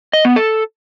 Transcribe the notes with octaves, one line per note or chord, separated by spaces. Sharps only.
D#5
B3
A4